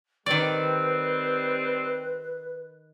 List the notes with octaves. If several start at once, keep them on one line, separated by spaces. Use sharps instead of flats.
D#3 G3 C4 B4 D5